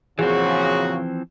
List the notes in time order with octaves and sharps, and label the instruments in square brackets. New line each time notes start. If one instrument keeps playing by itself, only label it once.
[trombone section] A#2 F#4 [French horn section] C#3 [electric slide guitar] E3 F3 C4 [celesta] G#4